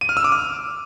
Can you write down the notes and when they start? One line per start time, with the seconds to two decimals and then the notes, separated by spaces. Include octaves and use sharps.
0.01 D#7
0.09 F6
0.17 E6
0.24 D6
0.32 F6